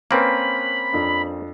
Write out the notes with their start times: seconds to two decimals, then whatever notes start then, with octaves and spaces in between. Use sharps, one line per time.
0.11 A#3 C4 C#4 B4 B5
0.93 F2 D4